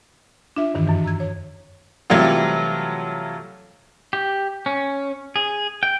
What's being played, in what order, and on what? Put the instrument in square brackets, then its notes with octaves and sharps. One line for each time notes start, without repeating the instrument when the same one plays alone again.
[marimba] D4 F4 E5
E2 G2 D#3 E3
F#2 E3
A#5 E6 G#6
C#5
[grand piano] C3 E3 F#3 G3 A3 F4
[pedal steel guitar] G4
C#4
G#4
G5